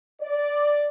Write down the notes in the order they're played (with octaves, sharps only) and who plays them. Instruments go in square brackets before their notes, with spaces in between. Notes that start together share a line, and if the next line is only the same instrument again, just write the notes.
[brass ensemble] D5